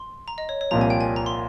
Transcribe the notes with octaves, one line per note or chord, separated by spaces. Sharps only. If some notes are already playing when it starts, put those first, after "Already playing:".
Already playing: C6
A#5
D#5
C#5
C#5
C2 A#2 F3 A#5
G#5
G5
G#5
A#5
C6